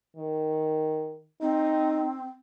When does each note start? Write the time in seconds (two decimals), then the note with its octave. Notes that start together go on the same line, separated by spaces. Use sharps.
0.17 D#3
1.42 C4 D#4